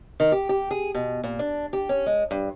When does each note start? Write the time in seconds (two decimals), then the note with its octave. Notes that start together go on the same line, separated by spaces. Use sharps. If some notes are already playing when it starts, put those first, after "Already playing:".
0.20 D#3
0.32 G4
0.49 G4
0.71 G#4
0.95 B2
1.24 A#2
1.39 D4
1.73 G4
1.89 C#4
2.06 G#3
2.31 G2